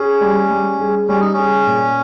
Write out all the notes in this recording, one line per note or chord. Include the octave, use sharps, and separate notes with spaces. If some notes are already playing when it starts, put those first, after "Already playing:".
Already playing: C#4 G#4
G3
G3
G#4
G3 C#4
D#4
C#4 G#4
A#2